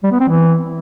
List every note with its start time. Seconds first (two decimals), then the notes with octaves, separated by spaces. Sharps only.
0.03 G3
0.12 B3
0.20 C4
0.28 E3